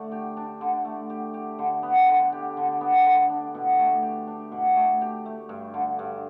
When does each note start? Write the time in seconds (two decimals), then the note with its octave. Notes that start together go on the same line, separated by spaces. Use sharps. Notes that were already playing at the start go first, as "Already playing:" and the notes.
Already playing: D3 A3 D4
0.12 G4
0.37 D4
0.61 D3
0.85 A3
1.10 G4
1.34 G4
1.59 D3
1.83 B3
2.08 D3
2.32 G4
2.57 D3
2.81 B3
3.05 D3
3.29 D4
3.55 B2
3.78 A3
4.02 G4
4.27 D4
4.52 B2
4.76 A3
5.01 G4
5.26 A3
5.49 G2
5.74 D3
5.99 G2